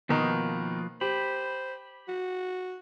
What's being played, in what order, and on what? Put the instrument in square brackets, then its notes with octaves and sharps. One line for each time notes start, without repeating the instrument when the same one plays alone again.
[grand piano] B2 D#3 D#4 [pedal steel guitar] F3 A#3 B4
[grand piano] G4 [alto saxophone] C5 [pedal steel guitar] B5
[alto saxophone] F#4